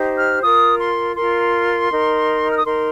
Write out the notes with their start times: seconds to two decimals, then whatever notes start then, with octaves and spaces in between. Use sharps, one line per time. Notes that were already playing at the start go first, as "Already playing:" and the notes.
Already playing: D#4 G4 C5
0.17 F6
0.42 F4 A#4 D#6
0.79 C6
1.16 F4 A#4 C6
1.91 D#4 A#4
2.49 F6
2.57 D#6
2.66 D#4 A#4 C6